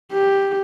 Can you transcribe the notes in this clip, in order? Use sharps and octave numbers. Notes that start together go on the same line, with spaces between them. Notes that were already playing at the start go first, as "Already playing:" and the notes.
G4